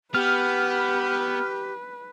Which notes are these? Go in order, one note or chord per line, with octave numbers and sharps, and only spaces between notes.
B3 G4 B4 F6